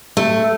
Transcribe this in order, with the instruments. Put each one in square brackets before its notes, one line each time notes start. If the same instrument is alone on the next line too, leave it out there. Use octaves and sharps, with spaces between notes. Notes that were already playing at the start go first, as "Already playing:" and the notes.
[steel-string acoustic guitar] A3